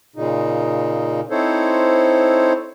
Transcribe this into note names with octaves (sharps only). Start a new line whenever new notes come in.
A#2 C#3 D#4
C4 D#4 E4 A4 C5 C#5